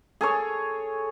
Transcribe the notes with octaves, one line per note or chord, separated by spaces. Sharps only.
G#4 A4 C#5